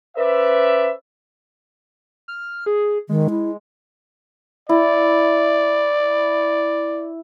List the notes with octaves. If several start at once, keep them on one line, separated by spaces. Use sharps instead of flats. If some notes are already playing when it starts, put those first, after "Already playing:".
C#4 B4 C5 D5 E5
F6
G#4
D#3 G#3
E4
E4 D5